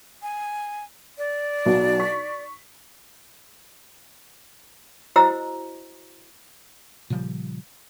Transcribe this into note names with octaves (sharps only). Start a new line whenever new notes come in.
G#5
D5
B1 B2 F#4
C#6 B6
E4 F#4 C5 D#5 A#5 E6
A#2 C#3 F3 G3